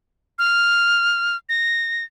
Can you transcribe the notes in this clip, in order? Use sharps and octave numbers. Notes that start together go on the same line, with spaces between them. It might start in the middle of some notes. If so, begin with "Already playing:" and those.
F6
A#6